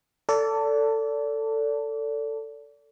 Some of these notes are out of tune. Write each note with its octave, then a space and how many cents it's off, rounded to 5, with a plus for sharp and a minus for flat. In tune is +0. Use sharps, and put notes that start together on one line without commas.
A4 +20 D5 -30